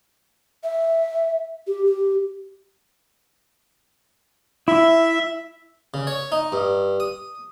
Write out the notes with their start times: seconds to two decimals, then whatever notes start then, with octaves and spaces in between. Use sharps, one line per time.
0.63 E5
1.67 G4
1.86 G4
4.68 E4 E5
5.94 C#3
6.07 C#5
6.32 D#4
6.52 G2
7.00 D#6